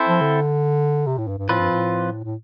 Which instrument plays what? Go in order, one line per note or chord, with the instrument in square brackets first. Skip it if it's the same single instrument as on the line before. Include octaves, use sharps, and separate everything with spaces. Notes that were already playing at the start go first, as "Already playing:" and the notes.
Already playing: [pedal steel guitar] C4 E4 A4 C5
[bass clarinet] F3
D3
C3
A2
G2
G2
[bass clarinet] A2 [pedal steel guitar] F3 C4 F4 B4
[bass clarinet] G2
A2
A2